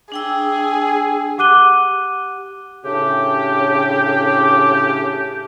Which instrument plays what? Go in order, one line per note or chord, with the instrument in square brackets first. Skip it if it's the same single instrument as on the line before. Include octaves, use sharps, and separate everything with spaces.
[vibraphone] D4 G5 E6 [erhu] G#4
[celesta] G4 F#5 D6 F#6 D#7 G7
[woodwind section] A2 C#3 D4 G4